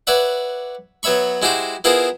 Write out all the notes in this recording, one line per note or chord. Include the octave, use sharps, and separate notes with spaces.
B4 C#5 D5 E5 F#5
F#3 B3 C#5 E5 B5 C#6
G#3 E4 F#4 G4 C5
B3 E4 F4 G#4 A#4 C5